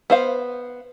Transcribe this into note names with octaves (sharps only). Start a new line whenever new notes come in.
B3 C5 F5